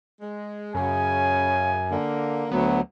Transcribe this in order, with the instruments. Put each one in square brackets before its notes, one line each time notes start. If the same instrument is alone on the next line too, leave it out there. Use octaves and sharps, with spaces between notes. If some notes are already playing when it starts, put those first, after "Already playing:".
[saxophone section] G#3
[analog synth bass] F#2 [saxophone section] C#3 [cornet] G#5
[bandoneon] D3 [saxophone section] A#3
[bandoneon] D2 F#3 [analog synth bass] B3